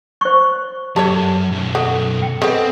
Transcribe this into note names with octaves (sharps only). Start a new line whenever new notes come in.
C5 C#6
F#2 G4 A4 C#5 A5
B1 F#2
F#4 A4
G5
G#3 B3 C4 A4